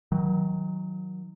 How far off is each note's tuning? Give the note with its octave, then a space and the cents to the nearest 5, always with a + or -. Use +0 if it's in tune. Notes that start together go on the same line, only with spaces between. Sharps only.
D#3 +30 F#3 +0